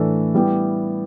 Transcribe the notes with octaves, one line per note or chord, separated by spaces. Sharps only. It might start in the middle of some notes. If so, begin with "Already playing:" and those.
Already playing: A2 E3 A3 D4 A4
G3 B3 E4 G4